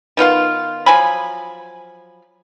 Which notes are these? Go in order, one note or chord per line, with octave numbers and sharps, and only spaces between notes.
D#3 B3 F4 F5
F3 F#3 G#5 B5